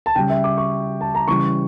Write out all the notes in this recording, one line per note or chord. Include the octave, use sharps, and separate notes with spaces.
A5
C#3 G3 G5
E5
D6
C#6
A5
A#5
C#3 E3 G3 C#6